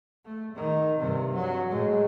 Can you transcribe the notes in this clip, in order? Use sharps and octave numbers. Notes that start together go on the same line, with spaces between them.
A3
D#3
G2 C3
F#3
A2 G#3